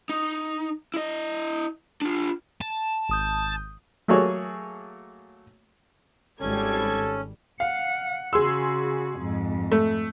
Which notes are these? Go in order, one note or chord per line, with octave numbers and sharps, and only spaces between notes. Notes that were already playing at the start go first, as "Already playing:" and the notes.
D#4
E4 D#5
D4 F4
A5
G#1 D#6 G6
F#3 A3 A#3 F#4 G#4 C#5
G#1 G3 C#4 A4 G#6
F5 F#5
C#3 F#4 G#4 C6 E6
F2 G#2
A3